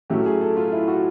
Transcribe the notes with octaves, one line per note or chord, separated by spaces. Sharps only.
A2 F#3 A3 C#4 G4
G#4
A4
F4
E4
F#4